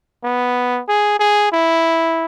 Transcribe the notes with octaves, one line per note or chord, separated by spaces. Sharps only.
B3
G#4
G#4
E4